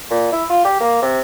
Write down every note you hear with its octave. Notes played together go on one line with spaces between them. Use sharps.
A#2
E4
F4
G4
A#3
C3